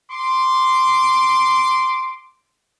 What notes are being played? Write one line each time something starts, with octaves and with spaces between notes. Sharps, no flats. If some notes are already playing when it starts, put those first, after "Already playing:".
C6 D6